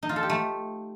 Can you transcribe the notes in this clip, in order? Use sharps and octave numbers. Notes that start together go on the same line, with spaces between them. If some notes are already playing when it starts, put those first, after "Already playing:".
D#4
F4
A4
G4
A3